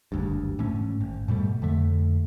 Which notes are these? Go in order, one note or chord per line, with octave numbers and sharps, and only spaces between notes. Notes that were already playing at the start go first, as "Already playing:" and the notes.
F#1 D2 G2
G#2 E3 A3 C#4
G#1
G#2 B2 G3 A3
F2 D3 A3